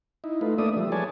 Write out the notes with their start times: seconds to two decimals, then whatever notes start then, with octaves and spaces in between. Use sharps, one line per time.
0.24 D#4 E4
0.41 A3 D#4 F4 B4
0.58 A3 A#3 D4 D5 E5 D#6
0.76 F3 G3
0.92 G#4 B4 C#5 D5 G#5 A5